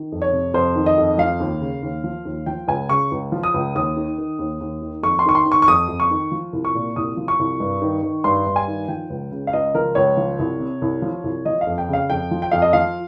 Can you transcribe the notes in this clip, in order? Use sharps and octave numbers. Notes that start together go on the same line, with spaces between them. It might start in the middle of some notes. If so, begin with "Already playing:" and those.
Already playing: D#3
F2
C#5
C3
F2 C5
D#3
D#5
F2
F3 F5
D#2
C#3
D#2
F3
D#2
F3 G5
C#2 G#5
C#3 C#6
C#2
F3
D#6
C#2
D#2 D#6
D#3
D#3
D#2
D#2
D#3
F2 C#6
C6
D#3 C#6
C6
D#3
C#6
C#6
F2 D#6
F2
C#6
D#3
F3
C2
C#6
A#2
C2 D#6
F3
C#6
C2
G2
D#3
D#3
G2 C6
G2
G#5
D#3
F3 G5
C#2
C#3
F5
C#2 D#5
F3 A#4
C#2 C#5
F3
C2
C3
C2
F3
C2
F3 D#5
F5
F2
G5
C#3 F5
F2 G5
F3
G5
F2 F5
D#5
F3 F5